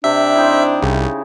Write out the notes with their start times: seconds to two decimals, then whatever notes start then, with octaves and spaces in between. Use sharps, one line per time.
0.04 C3 D4 E5
0.35 C4 D#4 E4
0.83 C2 C#3